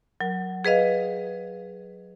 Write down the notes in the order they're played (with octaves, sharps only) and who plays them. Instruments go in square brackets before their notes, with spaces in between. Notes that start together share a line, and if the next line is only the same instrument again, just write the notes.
[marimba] F#3 A#4
G#4 B4 D#5 F5